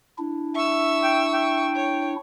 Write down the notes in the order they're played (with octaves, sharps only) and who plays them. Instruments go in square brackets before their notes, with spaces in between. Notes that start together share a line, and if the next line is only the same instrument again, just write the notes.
[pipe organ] D4 E4
[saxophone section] E5 [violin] C#6 E6
[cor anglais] G5
G5
[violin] C#5